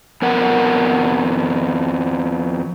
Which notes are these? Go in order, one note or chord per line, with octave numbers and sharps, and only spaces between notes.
F2 B3 A#4 F#5